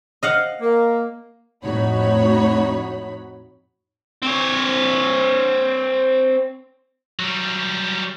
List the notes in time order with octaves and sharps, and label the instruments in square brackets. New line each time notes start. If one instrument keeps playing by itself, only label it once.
[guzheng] D#5 F5 F#5
[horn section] A#3
[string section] F2 A2 D#4 F#4 C#5 B5
[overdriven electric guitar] C4 C#5
[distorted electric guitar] F#3 G3